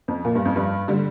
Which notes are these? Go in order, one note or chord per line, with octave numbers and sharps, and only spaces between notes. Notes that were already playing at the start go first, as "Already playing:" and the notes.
F2
A#2
G2
F2
G2
D3 G3